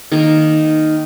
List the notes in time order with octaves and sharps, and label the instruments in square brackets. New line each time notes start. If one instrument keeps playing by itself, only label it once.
[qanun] D#3 A#3 D#4 A#4